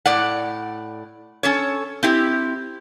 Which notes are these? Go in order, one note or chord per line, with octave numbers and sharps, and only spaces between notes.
A2 D5 F#5
C#4 A4 C#5
C4 E4 G4